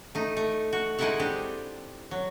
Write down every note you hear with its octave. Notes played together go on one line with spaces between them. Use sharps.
A3 D#4
A3
F#4
G#3 D#4 E4 A4 E5 F#5
C4 D4 G4
F#3